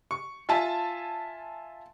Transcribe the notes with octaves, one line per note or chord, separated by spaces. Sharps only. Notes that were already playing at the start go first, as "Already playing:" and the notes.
C#6
F4 E5 G#5 A5